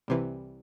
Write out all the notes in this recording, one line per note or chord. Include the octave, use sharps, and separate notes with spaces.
C2 C3 E3